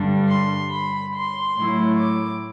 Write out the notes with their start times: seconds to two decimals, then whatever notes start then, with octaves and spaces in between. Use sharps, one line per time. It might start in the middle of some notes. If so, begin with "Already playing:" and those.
Already playing: G2 D3 G3 D4
0.28 C6
0.71 B5
1.14 C6
1.56 A2 F#3 A3 E4
1.99 D6